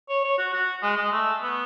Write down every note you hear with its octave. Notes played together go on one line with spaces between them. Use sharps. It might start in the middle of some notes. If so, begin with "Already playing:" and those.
C#5
C#5
F#4
F#4
G#3
G#3
A3
B3